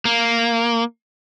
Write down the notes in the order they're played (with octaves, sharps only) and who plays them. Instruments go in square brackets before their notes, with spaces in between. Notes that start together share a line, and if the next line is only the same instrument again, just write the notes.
[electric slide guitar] A#3